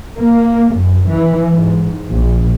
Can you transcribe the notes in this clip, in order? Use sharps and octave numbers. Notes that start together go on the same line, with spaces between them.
A#3
F#2
E3
G#2
A#1